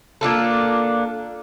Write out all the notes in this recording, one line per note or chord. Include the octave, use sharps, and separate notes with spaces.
A#3 D4 F4 A4